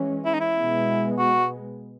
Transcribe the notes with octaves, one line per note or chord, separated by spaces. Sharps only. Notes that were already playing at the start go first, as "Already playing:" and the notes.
Already playing: E3 G#3 C#4
E4
D#4
E4
B2 G#3 B3
F#4